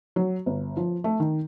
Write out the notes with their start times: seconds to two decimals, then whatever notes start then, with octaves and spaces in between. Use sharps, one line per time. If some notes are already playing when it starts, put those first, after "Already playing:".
0.16 F#3
0.46 G1
0.77 F3
1.04 A3
1.20 D#3